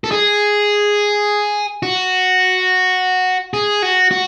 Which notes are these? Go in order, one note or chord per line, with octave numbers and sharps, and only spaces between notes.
A4
G#4
F#4
G#4
F#4
F#4